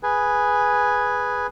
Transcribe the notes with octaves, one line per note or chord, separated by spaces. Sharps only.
G#4 B4 G#5